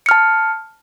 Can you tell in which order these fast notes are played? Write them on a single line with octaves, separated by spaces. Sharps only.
C#7 F6 A5